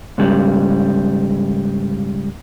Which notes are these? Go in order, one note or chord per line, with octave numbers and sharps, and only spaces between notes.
G#2 C#3 G3